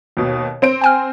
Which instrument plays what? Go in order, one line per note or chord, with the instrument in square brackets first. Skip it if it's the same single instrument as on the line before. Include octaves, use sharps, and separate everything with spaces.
[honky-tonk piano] D#2 B2
C4 C5 D7
[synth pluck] G5 G#5 F6